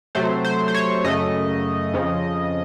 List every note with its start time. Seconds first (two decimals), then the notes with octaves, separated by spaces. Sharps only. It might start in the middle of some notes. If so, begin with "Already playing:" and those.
0.15 C3 F#3 A3 C5
0.44 C5
0.68 C5
0.74 C#5
1.04 F#2 C#3 A3 D#5
1.94 F2 C#3 F3